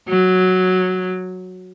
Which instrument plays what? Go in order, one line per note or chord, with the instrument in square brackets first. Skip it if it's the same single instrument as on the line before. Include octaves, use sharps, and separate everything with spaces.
[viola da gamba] F#3